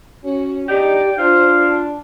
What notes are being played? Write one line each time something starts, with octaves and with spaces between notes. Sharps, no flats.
C#4 F#4
E2 D4 D#4 G4 D5 G5
D4 F4 C5 F5
A5